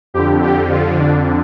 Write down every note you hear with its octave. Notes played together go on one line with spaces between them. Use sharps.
F2 D3 G4
G4
F4
D4